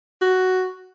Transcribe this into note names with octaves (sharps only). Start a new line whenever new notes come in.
F#4